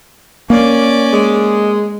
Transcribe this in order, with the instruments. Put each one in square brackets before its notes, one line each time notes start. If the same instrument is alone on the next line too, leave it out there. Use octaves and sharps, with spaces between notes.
[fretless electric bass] A#3 [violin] C#4 D5
[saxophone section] G#3